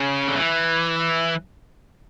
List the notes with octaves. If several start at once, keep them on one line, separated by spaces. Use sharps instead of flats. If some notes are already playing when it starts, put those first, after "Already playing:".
Already playing: C#3
D3
E3